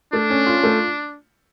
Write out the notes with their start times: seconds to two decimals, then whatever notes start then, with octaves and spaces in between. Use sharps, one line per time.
0.13 A3 D4
0.30 C#4
0.46 F4
0.63 A3